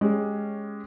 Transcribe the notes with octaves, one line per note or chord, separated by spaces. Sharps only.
G#3 C#4 G4